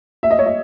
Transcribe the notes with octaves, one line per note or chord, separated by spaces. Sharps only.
E5
D#5
C#5
D#5